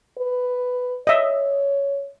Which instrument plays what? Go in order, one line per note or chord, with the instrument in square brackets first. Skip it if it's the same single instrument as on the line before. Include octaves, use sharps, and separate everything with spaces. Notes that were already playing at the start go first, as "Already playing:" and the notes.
[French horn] B4
[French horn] C#5 [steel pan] D#5 E5